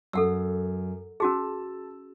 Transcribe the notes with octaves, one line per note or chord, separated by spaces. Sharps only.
F#2 A4 F#5 E6
C#4 F#4 G#4 A5 E6